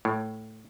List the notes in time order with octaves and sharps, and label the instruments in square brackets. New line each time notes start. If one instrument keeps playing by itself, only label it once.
[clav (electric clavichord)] A2